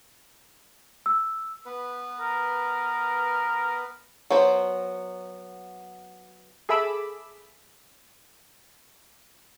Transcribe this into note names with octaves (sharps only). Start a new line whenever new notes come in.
E6
B3 B4
A#4
F#3 B3 C5
G#4 A4 E5 B5 D6 E6